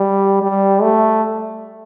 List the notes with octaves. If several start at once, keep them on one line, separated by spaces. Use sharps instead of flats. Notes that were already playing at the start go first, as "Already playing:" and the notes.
Already playing: G3
G3
A3